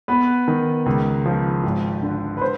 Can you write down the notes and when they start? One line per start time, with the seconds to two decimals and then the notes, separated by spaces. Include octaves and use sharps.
0.08 B3 B4
0.48 D#3
0.86 C#2
1.26 F3
1.64 G#1
2.02 D3
2.37 B4
2.41 C5